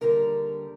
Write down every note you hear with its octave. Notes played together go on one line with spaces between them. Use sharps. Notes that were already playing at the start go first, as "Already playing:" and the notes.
D#2 D3 G3 A#4 A#5